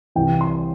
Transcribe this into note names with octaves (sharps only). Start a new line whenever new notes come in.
C2 C3 E3 G5
C6